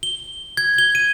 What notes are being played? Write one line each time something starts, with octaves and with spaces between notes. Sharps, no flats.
G7
G#6
G7
D#7